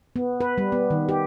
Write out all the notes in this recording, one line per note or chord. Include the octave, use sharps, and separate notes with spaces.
B3
B4
G3
B3
D#3
G4